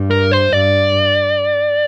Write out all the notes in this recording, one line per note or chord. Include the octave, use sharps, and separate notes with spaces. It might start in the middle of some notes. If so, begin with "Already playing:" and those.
Already playing: G2
A#4
C5
G2 D5